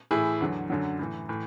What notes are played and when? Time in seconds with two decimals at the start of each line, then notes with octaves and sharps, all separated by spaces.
0.11 A2 E3 E4 G#4
0.41 E2 D3 F#3
0.70 F#2 D3 F#3
0.99 A2 E3
1.29 A2 E3